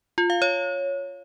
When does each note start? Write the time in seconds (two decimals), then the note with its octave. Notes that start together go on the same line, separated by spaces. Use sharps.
0.18 F4
0.30 F5
0.42 C#5